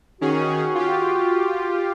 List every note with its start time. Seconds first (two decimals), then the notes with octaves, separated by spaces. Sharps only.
0.21 D#3 C#4 F#4 G#4
0.75 F4 G4